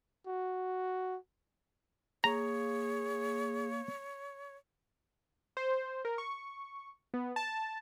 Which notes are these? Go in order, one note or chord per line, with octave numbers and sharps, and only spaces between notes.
F#4
A#3 G#4 C#5 A#5
C5
A#4
C#6
B3
A5